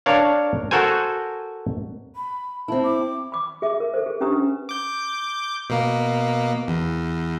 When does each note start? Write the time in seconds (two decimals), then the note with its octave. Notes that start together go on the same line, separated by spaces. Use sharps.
0.06 D4 A#4 C#5 F5
0.71 F#4 A4 A#4 C5 G#5
2.14 B5
2.68 C4 E4 A5
2.83 D6
3.32 B5 D6
3.62 G#4 E5 D6
3.80 A#4
3.94 A4 C5
4.06 G#4
4.21 C#4 D4 G4 B4 A#5 D#6
4.69 D6 G6
5.70 B2 A#3
6.68 E2